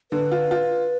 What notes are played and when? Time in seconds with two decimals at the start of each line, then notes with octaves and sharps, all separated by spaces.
0.12 D3 B4
0.32 F4
0.51 F4